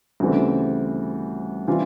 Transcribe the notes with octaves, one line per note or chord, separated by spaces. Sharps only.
D2 C#3 E3 G3 C4
E3 G3 C4 F4